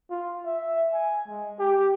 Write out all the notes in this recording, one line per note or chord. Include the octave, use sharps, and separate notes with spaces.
F4
E5
G#5
G#3
G4